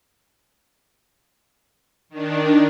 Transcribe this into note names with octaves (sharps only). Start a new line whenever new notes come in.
D#3 D4